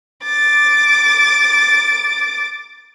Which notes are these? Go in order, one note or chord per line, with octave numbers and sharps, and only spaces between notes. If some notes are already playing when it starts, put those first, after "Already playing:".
D6 A6